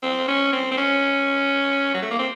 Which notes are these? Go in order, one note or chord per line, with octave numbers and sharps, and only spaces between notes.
C4
C#4
C4
C4
C#4
F#3
A3
A#3
C4